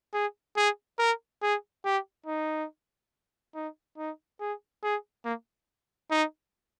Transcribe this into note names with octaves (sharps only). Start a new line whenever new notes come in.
G#4
G#4
A#4
G#4
G4
D#4
D#4
D#4
G#4
G#4
A#3
D#4